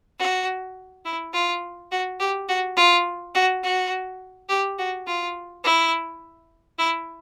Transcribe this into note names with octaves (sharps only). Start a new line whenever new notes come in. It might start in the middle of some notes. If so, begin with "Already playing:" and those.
F#4
E4
F4
F#4
G4
F#4
F4
F#4
F#4
G4
F#4
F4
E4
E4